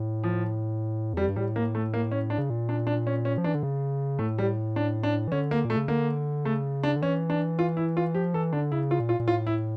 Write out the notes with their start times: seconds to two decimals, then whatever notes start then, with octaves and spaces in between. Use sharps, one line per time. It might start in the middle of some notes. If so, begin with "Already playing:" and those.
Already playing: A2
0.23 F3
1.14 E2
1.17 G3
1.21 F2
1.29 G2
1.36 A2 G3
1.56 A#3
1.75 A3
1.94 A#3
2.11 C#4
2.30 D4
2.38 C#3
2.50 A#2
2.69 D4
2.87 D4
3.07 C#4
3.25 C#4
3.38 F3
3.44 E3 D4
3.55 D3
3.63 C#3
4.19 A2 A3
4.38 G3
4.76 D4
5.03 D4
5.28 E3
5.32 D3 C#4
5.51 A#3
5.65 A#2
5.70 A3
5.77 C#3
5.88 D3 A#3
6.45 C#3 A3
6.83 D4
6.96 D3
7.02 E3 C#4
7.30 D4
7.59 F4
7.77 E4
7.97 F4
8.15 F3 G4
8.34 E3 A4
8.53 D3 D4
8.72 C#3 E4
8.91 F4
9.00 A#2
9.09 F4
9.20 A#2
9.28 A2 F4
9.47 E4